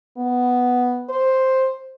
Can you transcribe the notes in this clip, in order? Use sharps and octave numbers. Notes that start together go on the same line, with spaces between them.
B3
C5